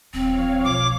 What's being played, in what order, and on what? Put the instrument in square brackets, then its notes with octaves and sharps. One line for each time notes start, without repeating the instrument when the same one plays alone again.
[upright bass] D#1 [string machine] F3 C#5 F5 [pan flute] C4
[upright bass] B1 [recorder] D6